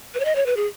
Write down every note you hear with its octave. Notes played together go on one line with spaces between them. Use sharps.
B4
C#5
D#5
C#5
B4
G#4